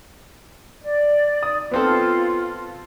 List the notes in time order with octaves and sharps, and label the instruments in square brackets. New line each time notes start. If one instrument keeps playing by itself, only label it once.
[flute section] D5
[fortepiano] D#6
[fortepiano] B3 C4 A4 [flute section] F4